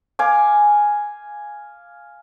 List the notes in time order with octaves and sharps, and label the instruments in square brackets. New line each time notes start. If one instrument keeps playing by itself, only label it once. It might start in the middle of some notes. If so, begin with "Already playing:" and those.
[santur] F5 G#5 D6